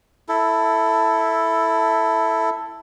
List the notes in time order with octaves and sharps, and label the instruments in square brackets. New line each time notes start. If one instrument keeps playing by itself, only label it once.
[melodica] E4 A4